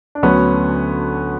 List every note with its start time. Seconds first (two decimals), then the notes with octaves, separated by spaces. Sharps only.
0.15 D4
0.23 D2 D3 F#3 B3 C#4